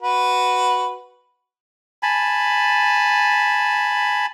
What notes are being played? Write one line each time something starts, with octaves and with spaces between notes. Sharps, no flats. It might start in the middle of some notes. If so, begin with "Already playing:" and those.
F#4 B4
G#5 A5 B5